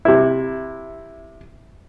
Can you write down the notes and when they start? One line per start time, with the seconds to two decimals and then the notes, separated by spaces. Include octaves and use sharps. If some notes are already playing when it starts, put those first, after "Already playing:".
0.05 C3 E4